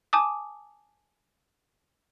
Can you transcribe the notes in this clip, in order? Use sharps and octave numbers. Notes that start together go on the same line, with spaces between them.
G#5 A5 D6 D#6